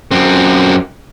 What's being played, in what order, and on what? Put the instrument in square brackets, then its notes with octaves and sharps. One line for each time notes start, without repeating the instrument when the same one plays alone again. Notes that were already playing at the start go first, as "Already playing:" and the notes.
[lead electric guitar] F#2 C4